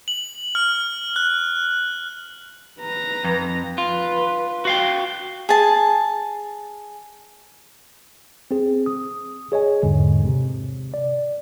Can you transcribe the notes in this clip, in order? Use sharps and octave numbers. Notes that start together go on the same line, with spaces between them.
F#7
F6
F#6
B4 A#5
F2
F4 B4
F#4 F5 G5
G#4 A5
C4 G#4
D#6
G#4 C#5 D#5 G#5
E2 G#2 D3 G#3
C3
D5